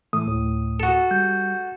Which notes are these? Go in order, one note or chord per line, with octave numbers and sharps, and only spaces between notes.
A2 E3 A3 D#6
D2 A2
F#4 A4
G3 G6